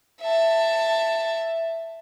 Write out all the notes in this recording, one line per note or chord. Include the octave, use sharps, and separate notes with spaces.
E5 A5